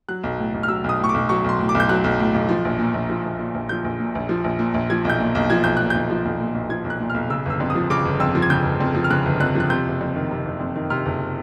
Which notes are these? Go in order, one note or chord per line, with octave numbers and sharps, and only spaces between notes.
F#3 F#6
B1
A2
B1
F6
F#3 E6
B1 D#6
A2 C#6
D6
B1
F#3 C#6
B1 C6
A2
D6
B1
G6
F#3 F#6
B1
A2
B1
F3
A#1
A#2
A#1
F3
A#1
A#2
A#1
F3 G6
A#1
A#2
A#1
F3
A#1
A#2
A#1
F3 G#6
B1 G6
A#2
B1
F3 G#6
B1 G6
A#2 F#6
B1 G6
F3
B1
A#2
B1
F3 G#6
B1
F#6
A#2
F6
B1
C#3 E6
G1 E6
F2
D#6
F3
C#3 D6
G1
F2 E6
F3
G#6
C#3 G6
G1
F2
F3
F6
C#3 F#6
G1
F2 F#6
F3 F#6
C3 G6
F#1
F2
D#3
C3
F#1
F2
D#3
C3 F6
F#1